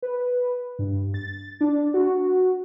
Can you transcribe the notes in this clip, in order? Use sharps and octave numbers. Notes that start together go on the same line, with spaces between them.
B4
G2
A6
D4
F#4